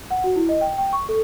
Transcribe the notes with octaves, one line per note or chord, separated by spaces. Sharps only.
F#5
F#4
E4
D#5
G5
G5
C#6
A4